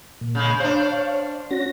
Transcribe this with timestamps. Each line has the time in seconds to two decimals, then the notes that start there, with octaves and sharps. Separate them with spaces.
0.21 A#2
0.35 C#3 G#3
0.60 D4 C5 C#5 F5
1.51 C#4 F#4 A#6